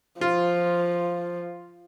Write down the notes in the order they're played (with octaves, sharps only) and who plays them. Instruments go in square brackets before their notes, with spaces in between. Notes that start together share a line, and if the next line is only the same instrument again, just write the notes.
[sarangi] F3 [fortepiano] F4